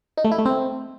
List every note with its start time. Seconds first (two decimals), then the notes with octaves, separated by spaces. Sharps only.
0.18 D#4
0.25 A3
0.32 E4
0.39 A3
0.46 C4